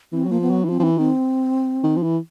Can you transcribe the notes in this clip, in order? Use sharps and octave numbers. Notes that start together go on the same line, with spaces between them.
E3 C4
F#3
F3 A#3
B3
F#3
E3
F3 C4
F3
E3
D#3 C4
D#3
F3
E3